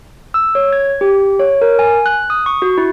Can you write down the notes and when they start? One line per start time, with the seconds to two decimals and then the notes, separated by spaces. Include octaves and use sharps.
0.34 E6
0.55 C#5
0.72 G#6
1.01 G4
1.39 C#5
1.61 A#4
1.79 G#5
2.06 F#6
2.30 D#6
2.46 C#6
2.62 F#4
2.78 E4